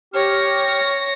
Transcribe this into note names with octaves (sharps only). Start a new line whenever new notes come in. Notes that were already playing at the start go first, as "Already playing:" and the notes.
G4 C#5 F6 A#6